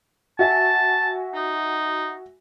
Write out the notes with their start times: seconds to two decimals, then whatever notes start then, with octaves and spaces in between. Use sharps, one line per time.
0.39 F#4 E5 G#5 A5
1.34 D#4